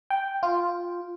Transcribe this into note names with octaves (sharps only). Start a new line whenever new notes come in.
G5
F4